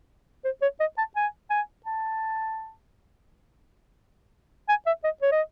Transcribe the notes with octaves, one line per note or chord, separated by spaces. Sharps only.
C5
C#5
D#5
A5
G#5
G#5
A5
G#5
E5
D#5
C#5
D#5